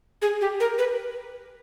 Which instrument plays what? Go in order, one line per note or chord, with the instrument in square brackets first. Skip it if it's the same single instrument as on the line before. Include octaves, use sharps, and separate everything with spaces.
[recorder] G#4
G4
A#4
B4